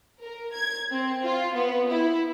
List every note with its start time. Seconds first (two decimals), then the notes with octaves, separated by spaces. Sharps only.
0.21 A#4
0.54 G#6
0.91 C4
1.23 F4
1.54 B3
1.91 E4